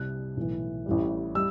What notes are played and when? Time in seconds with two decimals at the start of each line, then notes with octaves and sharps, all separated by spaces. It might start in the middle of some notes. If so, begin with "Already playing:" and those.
Already playing: C2 C3 G3 F#6
0.37 B1 A2 E3
0.86 A1 A2 G3
1.35 G3 E6